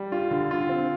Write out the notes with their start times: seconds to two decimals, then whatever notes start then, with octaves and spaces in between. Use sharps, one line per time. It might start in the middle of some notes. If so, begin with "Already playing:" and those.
Already playing: G3
0.12 F4
0.31 D3
0.51 F4
0.69 C4